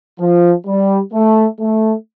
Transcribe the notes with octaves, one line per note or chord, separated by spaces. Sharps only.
F3
G3
A3
A3